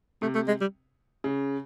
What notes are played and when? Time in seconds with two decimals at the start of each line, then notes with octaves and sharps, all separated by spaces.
0.22 C3 A3
0.35 A3
0.48 G#3
0.61 G3
1.24 C#3